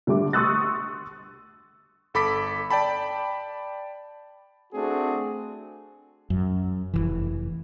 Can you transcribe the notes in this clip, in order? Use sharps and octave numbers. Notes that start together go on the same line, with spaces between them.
D3 G3 A3 D6
C6 C#6 D#6 E6 F#6 A6
G1 A4 B5 D6 B6
D5 G5 A5 B5
A3 C4 D4 F#4 G#4
F#2
F1 A#1 E3